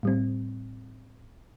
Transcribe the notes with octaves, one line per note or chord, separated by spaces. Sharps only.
A2 G3 C4